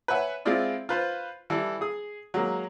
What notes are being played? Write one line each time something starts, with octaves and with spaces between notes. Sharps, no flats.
B4 C#5 E5 F#5 G#5
G#3 C4 E4 F4 D5
F4 B4 C5
E3 G3 A4
G#4 D#6
F#3 G#3 A#3